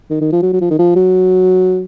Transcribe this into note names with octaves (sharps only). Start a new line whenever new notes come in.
D#3
D#3
F3
F#3
F#3
F3
D#3
F3
F#3